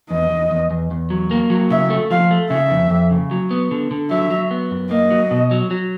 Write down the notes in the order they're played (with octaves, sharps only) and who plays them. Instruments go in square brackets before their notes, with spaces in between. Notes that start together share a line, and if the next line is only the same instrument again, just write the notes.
[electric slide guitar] E2 [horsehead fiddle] D#5
[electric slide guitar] E2
E2
E2
E2
F#3
A#3
F#3
[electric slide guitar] C#3 [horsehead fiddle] E5
[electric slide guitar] A3
[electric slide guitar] F3 [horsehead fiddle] F5
[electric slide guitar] A3
[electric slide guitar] C#3 [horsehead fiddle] E5
[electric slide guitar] F2
F2
C#3
F#3
B3
D3
D3
[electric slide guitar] F#3 [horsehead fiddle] E5
[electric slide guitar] F#3
B3
F#2
[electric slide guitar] A#3 [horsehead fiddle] D#5
[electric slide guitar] F#3
B2
F#3
F#3